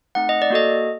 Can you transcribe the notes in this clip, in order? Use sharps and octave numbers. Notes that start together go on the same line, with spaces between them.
A3 C4 D#4 F#5
D#5
D5
A#3 F#4 A4 D#5